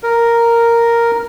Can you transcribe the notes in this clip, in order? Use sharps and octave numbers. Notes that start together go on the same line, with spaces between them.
A#4